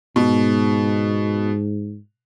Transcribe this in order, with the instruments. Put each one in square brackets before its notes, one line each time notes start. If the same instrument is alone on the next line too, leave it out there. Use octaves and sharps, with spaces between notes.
[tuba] G#2 [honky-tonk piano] B2